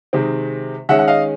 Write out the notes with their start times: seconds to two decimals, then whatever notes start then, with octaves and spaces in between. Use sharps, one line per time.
0.13 C3 D#3 G#3 C4
0.89 D#3 G#3 C#4 E5 F#5
0.99 F#5
1.08 D#5 F5